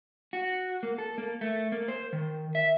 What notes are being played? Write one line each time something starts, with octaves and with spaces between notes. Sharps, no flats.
F#4
A#3
A4
A#3
A3
A#3
C5
D#3
E5